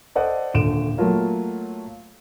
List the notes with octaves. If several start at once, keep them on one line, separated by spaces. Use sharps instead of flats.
A4 C5 D5 D#5 F#5
D#1 D3 D7 E7
F#3 A3 A#3 F4 A#4 C#5